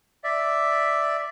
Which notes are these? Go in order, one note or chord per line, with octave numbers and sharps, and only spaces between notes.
D5 E5